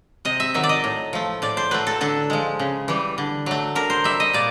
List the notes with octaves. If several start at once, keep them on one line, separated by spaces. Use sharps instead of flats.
C3 D#5
E5
D#3 F#3 E5
D5
D#5
A2
F3 A3
A2 D5
C5
F#3 A3 B4
A4
D3 A4
F3 G#3
C#3
E3 G3
D3
F#3 A3
D3 A#4
C5
G3 E5
D#5
A#2 D5